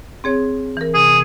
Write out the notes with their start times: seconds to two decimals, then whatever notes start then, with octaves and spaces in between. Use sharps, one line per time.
0.24 C4 G#4 C#5
0.77 E3 A#4
0.94 C3 G#4